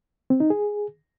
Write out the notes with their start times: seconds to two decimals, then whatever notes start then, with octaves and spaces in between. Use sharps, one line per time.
0.30 C4
0.40 D#4
0.50 G#4